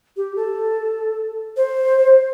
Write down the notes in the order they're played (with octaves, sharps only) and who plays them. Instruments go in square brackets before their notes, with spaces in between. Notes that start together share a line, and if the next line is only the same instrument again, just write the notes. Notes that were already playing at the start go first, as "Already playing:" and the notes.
[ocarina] G4
A4
C5